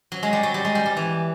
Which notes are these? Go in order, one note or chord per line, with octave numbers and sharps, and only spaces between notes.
F#3
G#3
G3
F#3
G3
G#3
G3
G3
E3